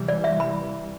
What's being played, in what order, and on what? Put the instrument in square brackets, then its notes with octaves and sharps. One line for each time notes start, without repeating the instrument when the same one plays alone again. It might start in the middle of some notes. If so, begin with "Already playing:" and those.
Already playing: [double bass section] C3 E3 G3
[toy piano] D5
E5
B5